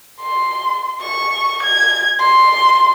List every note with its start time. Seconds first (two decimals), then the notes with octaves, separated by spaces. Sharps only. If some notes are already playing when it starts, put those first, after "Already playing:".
0.21 C6
1.02 C#6
1.63 G#6
2.20 C6